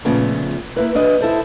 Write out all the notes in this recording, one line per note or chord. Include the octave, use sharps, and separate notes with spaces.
A#2 C#3 F3 A3 B3
A#3 E4 B4
D4 B4 D#5
E4 A4 C5